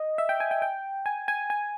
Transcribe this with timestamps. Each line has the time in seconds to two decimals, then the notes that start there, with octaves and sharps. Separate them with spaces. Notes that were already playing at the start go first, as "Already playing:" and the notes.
Already playing: D#5
0.18 E5
0.29 G5
0.40 G#5
0.51 G5
0.62 G5
1.06 G#5
1.28 G#5
1.50 G#5